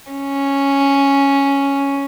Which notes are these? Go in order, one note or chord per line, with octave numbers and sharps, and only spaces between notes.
C#4